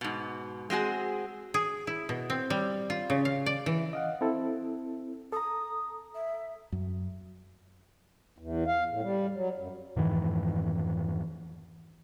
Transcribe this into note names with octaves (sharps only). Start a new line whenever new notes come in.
G#2 B2
G#3 C4 F#4 G#4
G#4
E4
B2
C4
G3
F4
C#3
F5
D5
E3
D#5 F5 F#5
C4 E4 A4
A4 A#5 D#6
E5
F#2
E2
F5
A2
G3
F#3
F#2
F2 G#2 D#3 E3